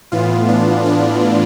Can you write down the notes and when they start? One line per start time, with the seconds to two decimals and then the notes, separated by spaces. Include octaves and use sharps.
0.12 A2 E3 B3 F4
0.48 D4
0.86 D4